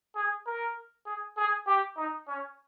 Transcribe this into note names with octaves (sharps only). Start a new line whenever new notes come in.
G#4
A#4
G#4
G#4
G4
D#4
C#4